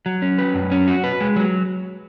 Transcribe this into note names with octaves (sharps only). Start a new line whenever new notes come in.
F#3
C#4
B4
F#2
C#4
F#4
B4
G#3
F#3